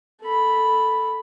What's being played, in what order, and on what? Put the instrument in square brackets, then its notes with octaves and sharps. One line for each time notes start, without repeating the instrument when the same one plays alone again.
[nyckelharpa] A4 B5